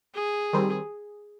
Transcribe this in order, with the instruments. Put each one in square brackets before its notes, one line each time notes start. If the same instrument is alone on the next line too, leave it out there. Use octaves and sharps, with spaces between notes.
[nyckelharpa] G#4
[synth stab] D#3 G3 C4